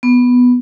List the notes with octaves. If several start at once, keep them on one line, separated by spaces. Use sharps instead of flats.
B3